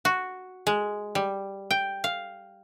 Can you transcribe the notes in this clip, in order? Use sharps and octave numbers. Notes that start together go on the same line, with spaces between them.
F#4
G#3
G3
G5
F5